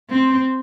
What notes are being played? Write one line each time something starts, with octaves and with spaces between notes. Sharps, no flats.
C4